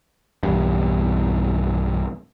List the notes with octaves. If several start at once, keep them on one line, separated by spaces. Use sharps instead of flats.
B1 E2 G2